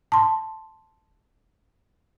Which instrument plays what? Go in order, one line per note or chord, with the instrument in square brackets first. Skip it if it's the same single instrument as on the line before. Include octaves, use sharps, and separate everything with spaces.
[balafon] A5 C6